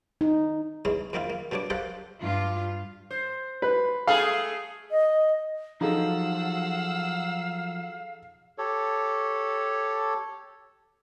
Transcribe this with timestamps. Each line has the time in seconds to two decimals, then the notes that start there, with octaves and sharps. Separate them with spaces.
0.21 D#4
0.85 E2 G#3 C#4 E4
1.13 F2 D#3 A#3 C4 E4 F4
1.30 A#3
1.51 B2 G3 D4 C#5 D6
1.70 G4 A4 A#4 C5 F5 F#5
2.21 G2 F4
3.11 C5
3.62 B4
4.07 A3 G#4 A4 F5
4.91 D#5
5.81 F3 F#3 D#4 G#4 A4 F5 F#5 E6
8.58 G4 A4 C#5